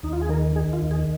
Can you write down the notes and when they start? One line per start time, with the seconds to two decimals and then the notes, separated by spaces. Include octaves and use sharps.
0.03 D#2 D#4
0.13 F4
0.21 G#4
0.29 D#3 A#4
0.56 D#3 G#4
0.73 F4
0.82 D#2
0.91 G#4